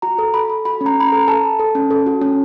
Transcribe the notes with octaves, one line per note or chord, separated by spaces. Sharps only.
F#4 A#5
A4
A4 B5
A4
F#4 B5
C#4
A#5
C#4 B5
A#5
A4
A4 A5
A4
A4
C#4
A4
F#4
C#4